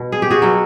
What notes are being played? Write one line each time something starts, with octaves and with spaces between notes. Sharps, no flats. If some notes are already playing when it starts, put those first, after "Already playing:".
Already playing: B2
G#4
G4
F#4 G#4
B2 F#3